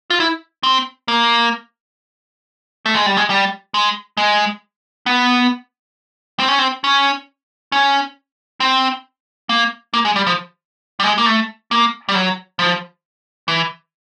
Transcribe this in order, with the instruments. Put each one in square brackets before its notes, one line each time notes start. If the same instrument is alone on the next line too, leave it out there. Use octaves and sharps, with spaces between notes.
[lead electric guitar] F4
E4
C4
A#3
A3
G#3
G3
G#3
G3
G#3
G#3
B3
C4
C#4
C4
C#4
C#4
C4
A#3
A#3
G#3
G3
F3
G3
G#3
A#3
A3
A#3
G3
F#3
F3
E3